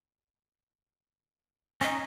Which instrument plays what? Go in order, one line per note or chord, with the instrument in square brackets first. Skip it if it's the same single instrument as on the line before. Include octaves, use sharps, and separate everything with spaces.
[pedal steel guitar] C#4 D#4 [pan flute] D#5